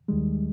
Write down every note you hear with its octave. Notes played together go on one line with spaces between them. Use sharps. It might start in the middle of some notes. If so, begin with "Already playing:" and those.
D#2 D#3 G3 G#3